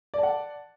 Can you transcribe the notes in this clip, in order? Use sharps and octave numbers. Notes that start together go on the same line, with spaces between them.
D5 F#5 A5